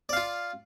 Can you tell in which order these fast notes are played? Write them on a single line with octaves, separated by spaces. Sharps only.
D5 F5 F4